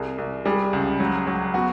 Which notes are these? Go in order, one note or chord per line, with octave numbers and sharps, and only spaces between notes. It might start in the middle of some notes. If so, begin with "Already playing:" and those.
Already playing: C2 G#4
C2
G3 G#4
C#2
F#3
F#3
B3 F#4